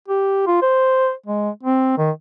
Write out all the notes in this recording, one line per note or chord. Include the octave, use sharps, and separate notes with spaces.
G4
F4
C5
G#3
C4
D#3